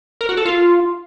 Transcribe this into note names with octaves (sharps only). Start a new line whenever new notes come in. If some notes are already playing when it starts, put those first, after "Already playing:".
A#4
F#4
A4
F4